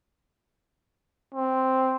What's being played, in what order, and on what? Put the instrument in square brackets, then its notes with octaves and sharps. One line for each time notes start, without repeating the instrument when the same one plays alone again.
[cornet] C4